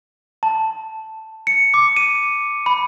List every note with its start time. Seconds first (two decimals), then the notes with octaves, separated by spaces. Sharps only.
0.43 A5
1.47 C#7
1.74 D6
1.96 D#7
2.66 B5